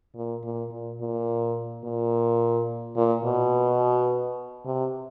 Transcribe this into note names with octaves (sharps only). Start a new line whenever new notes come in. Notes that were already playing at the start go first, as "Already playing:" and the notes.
A#2
A#2
A#2
A#2
A#2
A#2
B2
C3